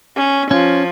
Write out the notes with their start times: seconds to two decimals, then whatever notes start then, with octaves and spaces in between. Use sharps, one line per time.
0.16 C#4
0.51 F3 C#4